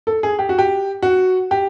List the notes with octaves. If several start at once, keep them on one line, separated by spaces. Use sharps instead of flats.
A4
G#4
G4
F#4
G4
F#4
G4